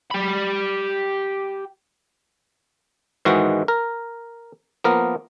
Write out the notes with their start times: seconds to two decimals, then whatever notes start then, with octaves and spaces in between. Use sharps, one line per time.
0.11 G4 B5
3.25 G#2 D#3 E3 G#3 F#4
3.68 A#4
4.84 F3 A#3 B3 A#4